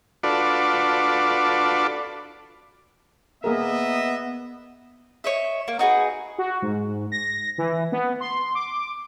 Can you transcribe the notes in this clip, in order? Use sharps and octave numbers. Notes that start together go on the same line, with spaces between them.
D4 F4 F#4 A4 B4 D5
A#3 B3 G#4 A#4 D#5 E5
C#5 D#5 E5
A#3
D#4 F#4 G#4 B4
F#4
G#2
A#6
E3
B3
C6
D6